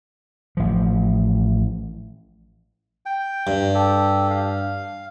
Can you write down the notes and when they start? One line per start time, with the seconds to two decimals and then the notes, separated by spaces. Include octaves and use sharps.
0.57 A1 F3
3.06 G5
3.47 G2
3.75 G4 A4
4.30 F5